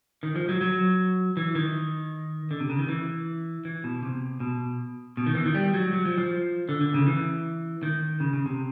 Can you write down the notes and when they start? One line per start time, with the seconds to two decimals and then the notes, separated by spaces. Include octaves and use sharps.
0.23 D#3
0.36 F3
0.49 F#3
0.61 F#3
1.37 E3
1.55 D#3
2.51 D3
2.60 C3
2.70 C#3
2.79 D#3
2.89 E3
3.65 E3
3.84 B2
4.03 C3
4.40 B2
5.17 B2
5.26 D#3
5.35 E3
5.46 D#3
5.55 G3
5.74 F#3
5.93 F#3
6.06 F3
6.18 F3
6.69 D3
6.81 D3
6.94 C#3
7.07 E3
7.83 D#3
8.20 C#3
8.33 C#3
8.46 C3